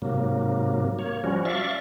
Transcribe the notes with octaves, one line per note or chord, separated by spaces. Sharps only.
G#2 C3 F#3 A#3
A#3 C#5
F3 G3 C#4 F#4
D5 E5 F5 C#6